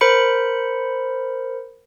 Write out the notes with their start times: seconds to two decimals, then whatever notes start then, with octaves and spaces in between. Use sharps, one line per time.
0.01 A#4 C5 B5 C#7